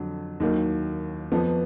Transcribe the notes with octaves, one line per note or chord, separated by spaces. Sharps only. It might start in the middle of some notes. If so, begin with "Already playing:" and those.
Already playing: F2 D3 F#3
D#2 D#3 F#3 A#3
F2 F3 B3